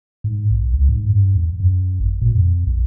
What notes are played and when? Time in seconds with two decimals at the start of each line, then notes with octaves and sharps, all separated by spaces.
0.24 G#2
0.51 B1
0.74 C#2
0.89 G#2
1.10 G2
1.35 E2
1.60 F#2
2.00 G#1
2.21 A#2
2.35 F2
2.67 B1